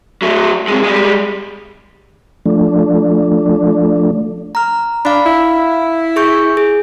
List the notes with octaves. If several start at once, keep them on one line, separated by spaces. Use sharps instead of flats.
F#3 A3
C3 G#3
G3 G#3
F3 A3 D4
A#5 F6
D4 F5 B5
E4
G#4 C#6 G6
G#4